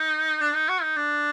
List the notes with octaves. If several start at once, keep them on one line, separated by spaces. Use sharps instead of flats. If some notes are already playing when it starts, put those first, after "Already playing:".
Already playing: D#4
D4
D#4
F#4
D#4
D4